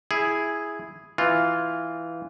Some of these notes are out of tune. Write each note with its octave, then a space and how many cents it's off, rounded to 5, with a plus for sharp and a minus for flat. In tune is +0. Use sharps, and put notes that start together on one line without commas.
E4 +0 G#4 +0
E3 +0 F4 +0